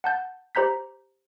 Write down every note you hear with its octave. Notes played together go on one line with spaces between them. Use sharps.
F#5 A5 G6 A6
G4 C5 A#5 G6 B6